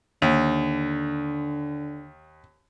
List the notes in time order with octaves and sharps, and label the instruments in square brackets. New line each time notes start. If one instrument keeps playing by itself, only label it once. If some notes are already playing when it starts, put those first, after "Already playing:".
[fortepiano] D#2 [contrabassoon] D3